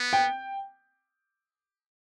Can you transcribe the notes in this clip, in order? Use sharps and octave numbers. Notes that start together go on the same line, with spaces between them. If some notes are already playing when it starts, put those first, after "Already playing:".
Already playing: B3
G5